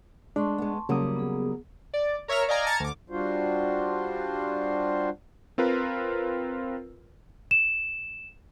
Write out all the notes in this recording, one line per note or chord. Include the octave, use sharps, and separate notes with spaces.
G#3 D4 A5 C6 C#6
G#3 B3
C#3 F#3 G3 A#3 D#6
B3 G#4
D5
A#4 C#5 E5 A#5 F6
D5 D#5 F5 G#5 A#5
A5 A#5 F6 G#6 A6 C#7
D2 D6
G3 D4 F4 F#4 C5
C4 F4 A#4 B4
E7